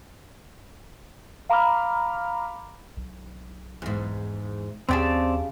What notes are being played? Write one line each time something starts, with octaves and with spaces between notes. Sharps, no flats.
F5 A#5 B5 D6 F6
B1
E2 G#2
D#2 C#3 C4 G4 G#4 D5 A5